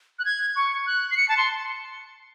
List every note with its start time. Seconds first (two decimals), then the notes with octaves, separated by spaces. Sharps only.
0.19 F#6
0.25 G#6
0.56 C#6
0.86 F#6
1.11 C7
1.17 C#7
1.29 A5
1.37 C6